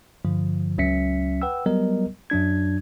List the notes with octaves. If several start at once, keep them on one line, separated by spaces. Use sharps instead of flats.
G2 D3 F3
C#2 F#3 C#4 E5 B6 C#7
B4 F#5 G5 E6
F#3 G3 B3 A#4 D#5
F#2 F#3 D4 G#6